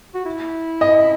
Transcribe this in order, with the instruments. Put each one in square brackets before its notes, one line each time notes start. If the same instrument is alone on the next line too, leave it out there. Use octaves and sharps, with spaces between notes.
[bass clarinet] F#4
E4
[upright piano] D#5